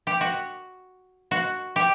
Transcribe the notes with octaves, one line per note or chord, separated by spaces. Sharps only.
G4
F#4
F#4
G4